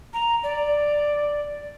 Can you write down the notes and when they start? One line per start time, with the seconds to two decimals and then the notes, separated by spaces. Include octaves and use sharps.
0.14 A#5
0.44 D5